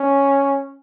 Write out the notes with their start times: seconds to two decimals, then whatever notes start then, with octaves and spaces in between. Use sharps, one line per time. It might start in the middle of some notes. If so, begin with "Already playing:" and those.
Already playing: C#4